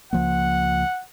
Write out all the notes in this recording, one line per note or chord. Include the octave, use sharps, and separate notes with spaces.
C#2 F3 A#3 F#5